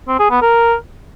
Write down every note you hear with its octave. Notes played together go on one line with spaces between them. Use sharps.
C4
G#4
B3
A#4